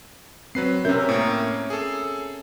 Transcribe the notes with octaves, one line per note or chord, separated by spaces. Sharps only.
F#3 C4 B4 C7
C3 C#4 A#4 E5 G6
A2 A#3
G#4 A4